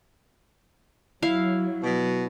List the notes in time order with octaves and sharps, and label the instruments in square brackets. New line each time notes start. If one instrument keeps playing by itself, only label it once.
[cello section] F#3 [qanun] E4 F5
[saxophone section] B2